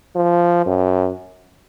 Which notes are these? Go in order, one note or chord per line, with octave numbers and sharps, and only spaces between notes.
F3
F#2